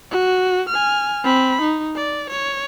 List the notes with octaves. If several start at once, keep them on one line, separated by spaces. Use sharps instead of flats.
F#4
G#5 F6
C4 B5
D#4
D5
C#5